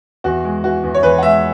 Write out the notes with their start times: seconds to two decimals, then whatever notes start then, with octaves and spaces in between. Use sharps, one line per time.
0.24 E2 F#4
0.44 G#3
0.64 E3 F#4
0.83 E2
0.95 C#5
1.03 E2 B4
1.18 F#5
1.23 G#3 E5